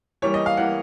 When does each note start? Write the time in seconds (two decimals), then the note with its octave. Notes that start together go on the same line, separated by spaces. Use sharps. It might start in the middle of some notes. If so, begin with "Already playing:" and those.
0.22 E3 G3 A#3 C#5
0.34 D#5
0.46 F5
0.57 E3 G3 A#3 F#5